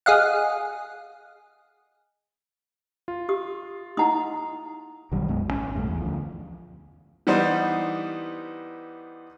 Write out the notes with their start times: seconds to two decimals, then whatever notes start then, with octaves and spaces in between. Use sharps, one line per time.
0.06 G#4 D#5 F5 F#5
3.08 F4
3.29 G4 D#6
3.97 D#4 E4 F#5 A#5 D#6
5.12 B1 D#3 F#3 G3
5.28 B1 F#2 G#3 B3
5.47 G#1 C#3 C#4
5.75 B1 E2 G2 A3
5.87 E2
6.01 D2 F3
7.27 E3 G3 B3 D#4 C5